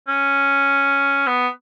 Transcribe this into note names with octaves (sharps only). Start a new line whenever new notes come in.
C#4
B3